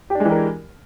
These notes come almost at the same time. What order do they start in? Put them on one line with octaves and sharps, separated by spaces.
G4 D4 G#3 E3 A#4